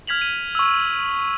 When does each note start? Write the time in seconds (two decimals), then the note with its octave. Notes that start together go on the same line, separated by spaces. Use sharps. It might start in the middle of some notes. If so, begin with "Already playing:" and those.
0.07 F6 G#6 B6 F7 F#7
0.22 D#7
0.55 C#6 E6